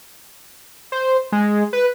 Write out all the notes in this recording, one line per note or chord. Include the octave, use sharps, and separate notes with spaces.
C5
G#3
B4